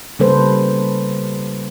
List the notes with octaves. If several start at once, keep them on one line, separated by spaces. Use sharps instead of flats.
C#3 G3 A#3 A4 B4 C5